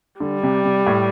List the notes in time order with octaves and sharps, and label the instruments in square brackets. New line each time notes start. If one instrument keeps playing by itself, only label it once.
[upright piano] D3 [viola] G3
[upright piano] C3
C3
A2